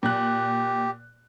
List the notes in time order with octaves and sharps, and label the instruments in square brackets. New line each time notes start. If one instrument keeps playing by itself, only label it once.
[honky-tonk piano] A#2 F#6 [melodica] G4